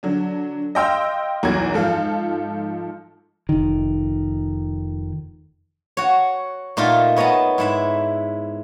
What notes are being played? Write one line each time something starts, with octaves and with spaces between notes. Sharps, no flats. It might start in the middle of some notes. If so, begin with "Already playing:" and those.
D3 F#3 D4
D#5 F5 G5 C6 E6 F6
B1 E2 F#4 A#4 G#6
G#2 F3 A4 F5
F1 D#3
F#4 C#5
A#2 A3 D#4 F4 A#4
B3 C#5 D#5 A5 A#5
G#2 E4 E5